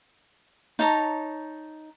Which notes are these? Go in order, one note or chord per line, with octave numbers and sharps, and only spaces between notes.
D#4 C#5 A5 A#5